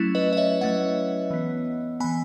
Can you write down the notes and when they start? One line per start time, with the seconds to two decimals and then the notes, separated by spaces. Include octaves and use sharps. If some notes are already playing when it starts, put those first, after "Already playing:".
Already playing: F#3 A3 C#4 E4
0.15 B4 D#5
0.33 D#5
0.37 C#5 E5
0.61 F#3 A3 C#4 D#5 F#5
1.30 E3 B3
2.00 E3 B3 G#5 B5